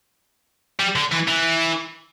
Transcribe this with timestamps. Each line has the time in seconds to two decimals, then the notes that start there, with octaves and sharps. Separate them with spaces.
0.79 G3
0.96 D3
1.12 E3
1.28 E3